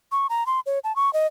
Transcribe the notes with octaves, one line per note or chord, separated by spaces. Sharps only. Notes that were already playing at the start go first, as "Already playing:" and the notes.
C#6
A#5
C6
C#5
A5
C#6
D#5